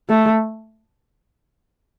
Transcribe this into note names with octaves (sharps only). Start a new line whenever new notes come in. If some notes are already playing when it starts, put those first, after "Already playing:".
A3